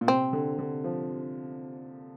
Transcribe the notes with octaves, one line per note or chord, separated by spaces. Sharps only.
A#2
C3 C4
D3
D3
F3